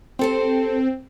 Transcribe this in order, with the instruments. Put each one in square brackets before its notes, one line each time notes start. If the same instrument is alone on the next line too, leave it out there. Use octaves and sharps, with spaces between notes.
[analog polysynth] C4 [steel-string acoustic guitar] G4 A4 C5